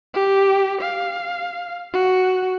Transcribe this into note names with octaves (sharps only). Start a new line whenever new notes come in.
G4
F5
F#4